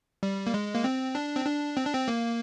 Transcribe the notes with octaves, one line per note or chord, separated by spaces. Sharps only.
G3
A#3
G#3
A#3
C4
D4
C4
D4
C4
D4
C4
A#3